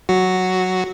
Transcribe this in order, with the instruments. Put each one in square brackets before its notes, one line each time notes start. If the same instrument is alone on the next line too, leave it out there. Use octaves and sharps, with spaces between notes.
[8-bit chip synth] F#3 F#4